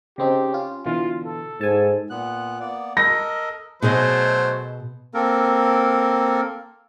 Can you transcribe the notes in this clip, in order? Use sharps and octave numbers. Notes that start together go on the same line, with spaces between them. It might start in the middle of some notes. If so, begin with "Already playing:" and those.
C#3 C4 D#4 G4
C#4 F4
B2 D3 E3 F4
A4
G#2 G#5 A5
A#2 B3 F#6
A#3 B3 D5
A4 A#4 D#5 A#6
B2 F#3 A3 G#4 C5 D#5
A#3 C4 A4 A#4